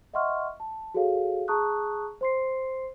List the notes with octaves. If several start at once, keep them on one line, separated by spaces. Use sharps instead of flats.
D#5 E5 F#5 C6 C#6 F6
A5
F#4 G#4 A4 C#5 F5
G#4 A5 A#5 C#6 D#6 F#6
C5 C6 C7